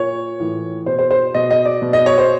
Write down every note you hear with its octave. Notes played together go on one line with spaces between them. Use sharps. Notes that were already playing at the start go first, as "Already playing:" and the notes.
Already playing: A#2 C#5
A2 E3
B2 C5
C5
C5
B2 D#5
D#5
D5
B2
D#5
C#5
C5